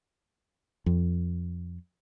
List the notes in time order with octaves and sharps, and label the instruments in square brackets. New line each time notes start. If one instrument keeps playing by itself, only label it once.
[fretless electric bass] F2